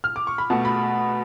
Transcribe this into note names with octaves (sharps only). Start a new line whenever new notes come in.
F6
D6
C#6
B5
B2 A3 A5
B5